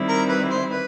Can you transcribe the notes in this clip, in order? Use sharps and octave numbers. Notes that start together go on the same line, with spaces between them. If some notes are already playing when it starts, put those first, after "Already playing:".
Already playing: D#3 G3 C4 E4
A#4
B4
C5
B4